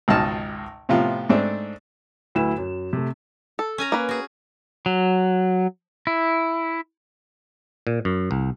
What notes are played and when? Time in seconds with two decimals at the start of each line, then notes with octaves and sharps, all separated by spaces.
0.08 G#1 C#2 B2 D#4 A5 F6
0.89 A2 C3 F3 B3 F4
1.29 G#2 A3 C4 D4
2.35 D2 F#3 E4 B4 E7
2.58 F#2
2.93 C3 A3
3.59 A4
3.78 C#4 G#5 A#5
3.92 A#3 B4
4.09 F#4 G#4
4.86 F#3
6.07 E4
7.87 A#2
8.05 F#2
8.31 C2